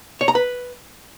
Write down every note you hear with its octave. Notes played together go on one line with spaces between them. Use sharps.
C#5
A#5
B4